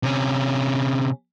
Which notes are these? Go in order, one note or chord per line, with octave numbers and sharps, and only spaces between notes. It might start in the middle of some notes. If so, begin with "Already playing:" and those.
C3 C#4